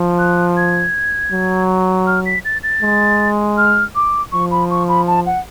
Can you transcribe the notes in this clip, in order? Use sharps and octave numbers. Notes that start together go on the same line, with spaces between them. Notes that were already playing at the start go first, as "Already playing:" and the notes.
Already playing: F3
F#6
G#6
F#3
F6
B6
A6
A6
G#3
F6
D6
F3 C#6
B5
C#6
B5
A5
F#5